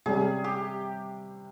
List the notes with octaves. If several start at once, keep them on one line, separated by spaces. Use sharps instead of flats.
C3 G3 C#4 G#4
G4